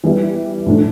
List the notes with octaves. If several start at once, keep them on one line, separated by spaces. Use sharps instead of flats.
E3 G3 B3 E4 G4
A2 F3 A3 D4